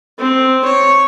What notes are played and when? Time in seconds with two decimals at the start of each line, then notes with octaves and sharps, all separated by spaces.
0.18 C4
0.65 C#5